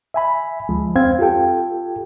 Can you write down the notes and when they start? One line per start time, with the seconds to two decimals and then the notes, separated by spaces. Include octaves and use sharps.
0.14 E5 G#5 B5
0.69 D2 F3 G#3
0.95 F2 C4 F5 G#6
1.19 F4 G4 A4 G5